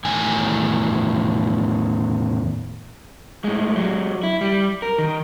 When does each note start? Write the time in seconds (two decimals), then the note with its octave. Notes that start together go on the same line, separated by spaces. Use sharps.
0.05 E2 A2 D#3 G#5
3.44 A2 G#3
3.76 F#3 G#3
4.23 E4
4.41 G3
4.82 A#4
4.99 D#3